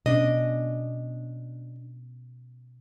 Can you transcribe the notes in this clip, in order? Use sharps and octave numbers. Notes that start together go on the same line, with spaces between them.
B2 C#4 D4 D#5